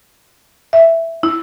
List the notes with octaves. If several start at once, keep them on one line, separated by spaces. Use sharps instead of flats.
E5
E4